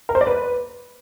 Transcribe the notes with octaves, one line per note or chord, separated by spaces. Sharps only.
A#4
C5
D5
B4